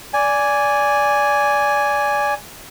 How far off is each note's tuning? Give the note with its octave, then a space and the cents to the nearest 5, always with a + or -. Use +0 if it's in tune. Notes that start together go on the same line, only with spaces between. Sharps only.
D5 -15 G#5 +0